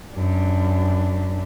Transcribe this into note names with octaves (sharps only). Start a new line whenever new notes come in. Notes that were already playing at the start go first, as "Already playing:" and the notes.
F#2 D4